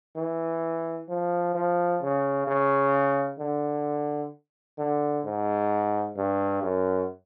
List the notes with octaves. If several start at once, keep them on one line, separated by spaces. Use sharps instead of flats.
E3
F3
F3
C#3
C#3
D3
D3
G#2
G2
F#2